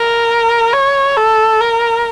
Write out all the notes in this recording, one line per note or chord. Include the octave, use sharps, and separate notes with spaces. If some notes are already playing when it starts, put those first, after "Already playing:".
Already playing: A#4
C#5
A4
A#4